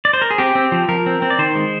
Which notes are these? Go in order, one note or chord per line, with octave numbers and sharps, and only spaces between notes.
D5
C5
A#4
G#4
C4 G4
C4
F3
F3 A#4
C4
C4
D5
D#3 C5
G#3